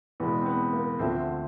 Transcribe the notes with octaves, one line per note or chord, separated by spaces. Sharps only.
E2 B2 G#3 B3
C4
B3
A#3
D2 D3 F3 A3 C4